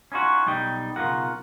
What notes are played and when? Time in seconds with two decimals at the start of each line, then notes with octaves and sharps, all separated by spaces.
0.12 C#4 D#4 F4 F#4
0.46 B1 G3 D#4 G5
0.96 B1 C#3 E3 F4 A#4 F#5